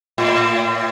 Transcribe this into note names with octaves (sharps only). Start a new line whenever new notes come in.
A2